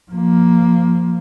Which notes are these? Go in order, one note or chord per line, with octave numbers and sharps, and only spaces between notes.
F3 A#3